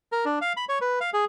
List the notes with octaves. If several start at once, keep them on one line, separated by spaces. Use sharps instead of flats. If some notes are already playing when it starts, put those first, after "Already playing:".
A#4
D4
F5
B5
C#5
B4
F5
G#4